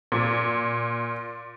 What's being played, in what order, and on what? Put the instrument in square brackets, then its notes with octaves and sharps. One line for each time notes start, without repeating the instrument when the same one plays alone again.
[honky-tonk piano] A#2